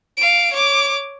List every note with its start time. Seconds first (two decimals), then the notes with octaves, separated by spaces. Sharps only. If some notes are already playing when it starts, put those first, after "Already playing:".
0.17 F5 D7
0.53 C#5 D6